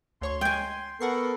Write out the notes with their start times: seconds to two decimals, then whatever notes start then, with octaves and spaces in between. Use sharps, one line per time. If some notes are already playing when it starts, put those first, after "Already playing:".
0.21 D2 C#5 C6 C#6
0.41 G#3 G5 G#5
1.01 B3 A4 A#4 F#5 C#6 C7